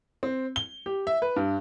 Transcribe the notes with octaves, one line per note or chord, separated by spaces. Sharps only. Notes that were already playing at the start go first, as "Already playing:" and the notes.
C4
G7
G4
E5
B4
G2